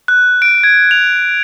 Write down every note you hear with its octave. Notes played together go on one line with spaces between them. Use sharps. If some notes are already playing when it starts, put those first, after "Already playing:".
F#6
D7
G#6
F7